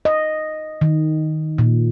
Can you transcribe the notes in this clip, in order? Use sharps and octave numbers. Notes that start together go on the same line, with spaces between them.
D#5
D#3
A#2